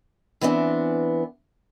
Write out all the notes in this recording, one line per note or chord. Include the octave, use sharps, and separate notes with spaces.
E3 B3 C4 D4